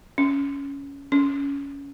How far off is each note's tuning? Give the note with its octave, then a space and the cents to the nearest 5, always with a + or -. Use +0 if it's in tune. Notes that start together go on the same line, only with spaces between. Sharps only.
C#4 +10
C#4 +20